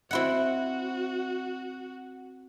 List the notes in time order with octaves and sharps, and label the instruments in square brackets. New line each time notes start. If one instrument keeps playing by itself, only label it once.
[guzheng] C4 E4 F#5 [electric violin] F#4